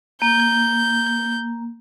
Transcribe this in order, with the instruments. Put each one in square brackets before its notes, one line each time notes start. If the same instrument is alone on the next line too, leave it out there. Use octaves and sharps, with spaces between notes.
[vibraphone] A#3 [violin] G6